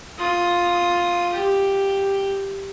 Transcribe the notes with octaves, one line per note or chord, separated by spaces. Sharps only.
F4 D#6
G4